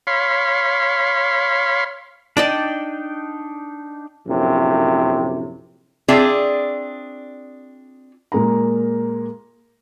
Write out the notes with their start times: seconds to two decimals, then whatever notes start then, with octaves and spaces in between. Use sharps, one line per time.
0.07 C#5 F5 B5 C6
2.37 D4 D#4 D5 D#5 G5 A5
4.27 A#1 F#2 A2 C3
6.08 C4 D4 F4 G#4 D5 E5
8.32 A#2 G#3 A#3 A#5